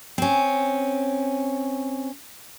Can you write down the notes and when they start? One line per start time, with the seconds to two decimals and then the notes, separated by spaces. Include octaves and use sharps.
0.18 C4 C#4